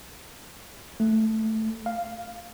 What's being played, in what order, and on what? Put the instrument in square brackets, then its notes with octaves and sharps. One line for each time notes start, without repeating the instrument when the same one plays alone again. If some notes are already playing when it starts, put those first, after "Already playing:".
[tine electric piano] A3
F5